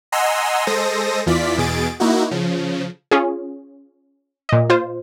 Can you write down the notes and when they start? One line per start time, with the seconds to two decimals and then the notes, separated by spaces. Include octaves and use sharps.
0.12 D#5 F#5 G#5 A#5 C6 E6
0.67 G#3 A4 C5 D#6 A#6
1.26 E2 E3 F4 D5 B6
1.57 E2 B2 G#4 A6 D7
2.00 A#3 D#4 E4 F#4
2.31 C#3 F3
3.11 C#4 F4 G#4
4.49 A#2 D#5
4.70 F4 C5